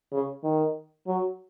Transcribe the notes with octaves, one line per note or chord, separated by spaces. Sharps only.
C#3
D#3
F#3